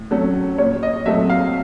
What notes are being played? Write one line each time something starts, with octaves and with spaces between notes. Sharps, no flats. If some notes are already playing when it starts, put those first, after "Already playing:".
Already playing: A2
F#3 A3 C#4
A#2 C#5
D#5
F#3 A3 C4 E5
F5